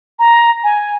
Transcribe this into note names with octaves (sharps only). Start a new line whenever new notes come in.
A#5
G#5